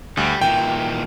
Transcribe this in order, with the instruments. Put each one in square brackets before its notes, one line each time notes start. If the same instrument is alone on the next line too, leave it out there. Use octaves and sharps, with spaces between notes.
[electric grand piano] D2 [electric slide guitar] G3
[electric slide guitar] A#2 D#3 E3 [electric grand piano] G5